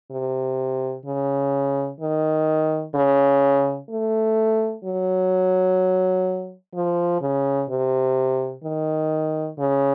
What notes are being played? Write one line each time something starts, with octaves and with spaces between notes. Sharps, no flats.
C3
C#3
D#3
C#3
A3
F#3
F3
C#3
C3
D#3
C#3